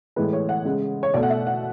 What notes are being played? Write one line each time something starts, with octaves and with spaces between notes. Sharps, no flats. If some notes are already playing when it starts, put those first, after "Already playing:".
A2 E3 G#3 B4
C#5
F#5
C#3 G#3
C#5
B2 A3 D5
F#5
E5
F#5